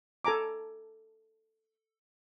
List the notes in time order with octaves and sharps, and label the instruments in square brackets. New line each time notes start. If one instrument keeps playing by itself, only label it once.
[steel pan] A4 G#5 A#5 D6